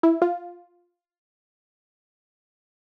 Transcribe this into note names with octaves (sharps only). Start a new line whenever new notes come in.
E4
F4